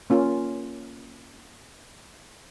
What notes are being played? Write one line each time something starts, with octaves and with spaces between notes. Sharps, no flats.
A#3 C#4 F4